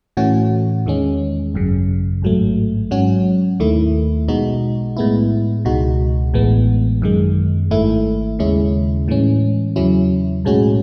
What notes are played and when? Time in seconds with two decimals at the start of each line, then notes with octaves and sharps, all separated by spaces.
0.17 A2 E3 A3 C#4 F#4
0.86 E2 D#3 G#3 C#4
1.54 G#1 F#2 C#3
2.22 A1 G#2 F#3 A3
2.91 G#2 F#3 C#4 F#4
3.60 D#2 D#3 A3 E4
4.28 B1 B2 G#3 D#4 F#4
4.97 A2 G#3 B3 E4
5.65 C#2 B2 G#3 D#4 F#4
6.34 A1 A2 E3 G#3 B3
7.02 F#2 D#3 G#3
7.71 G#1 G#2 D#3 A3 E4
8.39 D#2 C#3 G#3 C#4 E4
9.08 A2 E3 G#3 C#4
9.76 E2 C#3 F#3 C#4 E4
10.45 B1 A2 G#3 C#4 F#4